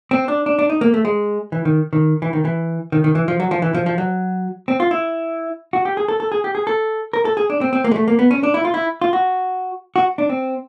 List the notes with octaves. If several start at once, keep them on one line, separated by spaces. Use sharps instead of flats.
C4
D4
D4
D4
D#4
A#3
A3
G#3
E3
D#3
D#3
E3
D#3
E3
D#3
D#3
E3
F3
F#3
F3
E3
F3
F3
F#3
C4
F4
E4
F#4
G4
G#4
A4
A4
G#4
G4
G#4
A4
A#4
A4
G#4
D4
C4
C4
A#3
G#3
A3
A#3
B3
C#4
D4
E4
F4
E4
F4
F#4
F#4
D4
C4